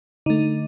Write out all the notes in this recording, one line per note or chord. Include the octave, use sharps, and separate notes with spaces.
D3 A3 D#4